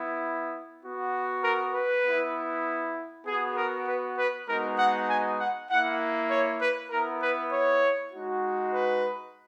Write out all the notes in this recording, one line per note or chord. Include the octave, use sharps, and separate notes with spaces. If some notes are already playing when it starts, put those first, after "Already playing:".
Already playing: B3 E4
B3 F#4
A#4
B4
B3 E4
B3 F#4 G#4
A#4
B4
B4
G#3 B3 D#4 F#4 A#4
F#5
G#5
F#5
A#3 E4 F#5
C#5
B4
B3 E4 A#4
B4
C#5
G#3 D#4 F#4
B4